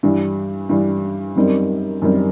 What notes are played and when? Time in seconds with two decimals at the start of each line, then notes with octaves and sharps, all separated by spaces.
0.03 G2 E3 G3
0.69 G2 E3 G3
1.36 F#2 D#3 G3 C4
2.02 F#2 D#3 G3 C4